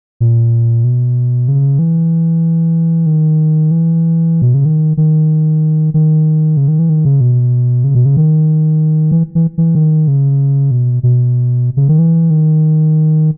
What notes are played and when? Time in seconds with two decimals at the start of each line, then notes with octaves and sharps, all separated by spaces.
0.20 A#2
0.84 B2
1.48 C#3
1.79 E3
3.06 D#3
3.71 E3
4.42 B2
4.54 C#3
4.65 D#3
4.97 D#3
5.94 D#3
6.57 C#3
6.68 D#3
6.79 E3
6.90 D#3
7.05 C#3
7.21 B2
7.84 C#3
7.95 B2
8.05 C#3
8.17 D#3
9.11 E3
9.35 E3
9.58 E3
9.75 D#3
10.08 C#3
10.71 B2
11.03 B2
11.77 C#3
11.89 D#3
11.99 E3
12.30 D#3